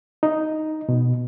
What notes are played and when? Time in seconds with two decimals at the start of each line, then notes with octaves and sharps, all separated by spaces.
0.23 D#4
0.89 B2